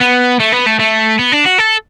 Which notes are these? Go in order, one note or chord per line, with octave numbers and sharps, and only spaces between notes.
B3
A3
B3
A3
A3
B3
D4
F#4
A4